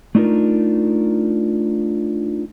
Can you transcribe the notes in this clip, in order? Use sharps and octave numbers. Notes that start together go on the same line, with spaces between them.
A3 D4 D#4 F4 A#4